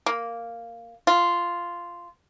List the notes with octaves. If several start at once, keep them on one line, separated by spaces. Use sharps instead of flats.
A#3
F4